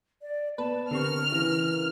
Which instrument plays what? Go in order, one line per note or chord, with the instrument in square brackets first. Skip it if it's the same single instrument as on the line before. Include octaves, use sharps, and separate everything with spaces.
[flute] D5
[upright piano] B3 [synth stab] B4 [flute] A5
[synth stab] D3 C4 C#6 [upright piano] G4 [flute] A#4 [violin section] F6
[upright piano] C#3 E3